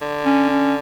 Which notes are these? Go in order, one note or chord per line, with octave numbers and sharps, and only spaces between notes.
D3
C#4
C#4